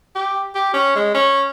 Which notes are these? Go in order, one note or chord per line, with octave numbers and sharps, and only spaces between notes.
G4
G4
C#4
G#3
C#4